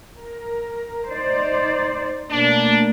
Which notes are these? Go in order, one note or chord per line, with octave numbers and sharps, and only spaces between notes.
A#4
D#4 C5 D5
B2 A3 A#3 D4